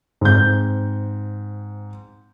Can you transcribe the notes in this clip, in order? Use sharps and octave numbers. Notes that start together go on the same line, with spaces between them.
G#2 C4 G6